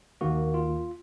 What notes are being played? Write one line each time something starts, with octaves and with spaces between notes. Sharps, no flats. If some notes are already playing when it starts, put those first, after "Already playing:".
D#2 D#3 A#3 F#4
F4